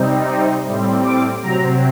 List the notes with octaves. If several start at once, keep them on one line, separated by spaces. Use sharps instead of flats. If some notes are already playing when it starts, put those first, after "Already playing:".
Already playing: C3 G3 C4 D#4
A2 G3 C4
D6
C3 F#3 C4 A#5